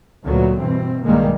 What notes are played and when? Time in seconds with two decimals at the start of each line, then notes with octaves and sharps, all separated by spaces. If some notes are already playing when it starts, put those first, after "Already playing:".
0.24 D2 A#2 F#3 B3
0.59 G2 B2 E3 C4
1.04 B1 G2 D#3 G3 G#3 A#3